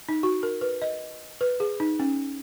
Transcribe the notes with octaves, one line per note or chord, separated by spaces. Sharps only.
D#4
F#4
A#4
B4
D#5
B4
G#4
D#4
C#4